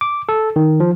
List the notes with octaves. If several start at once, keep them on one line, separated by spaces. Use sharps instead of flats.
D6
A4
D#3
F3